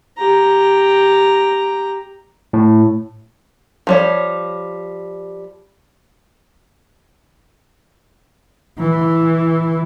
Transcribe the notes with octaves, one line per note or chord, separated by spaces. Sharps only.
G4 A#5
A2
F3 G3 C#5
E3